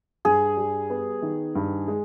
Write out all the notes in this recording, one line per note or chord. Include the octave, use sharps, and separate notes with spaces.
G2 G#4
G3
B3
D#3
G2
G#3